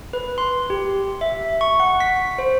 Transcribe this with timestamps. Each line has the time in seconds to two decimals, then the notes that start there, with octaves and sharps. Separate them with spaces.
0.13 B4
0.38 C6
0.70 G4
1.21 E5
1.61 C#6
1.80 F#5
2.00 B6
2.38 C5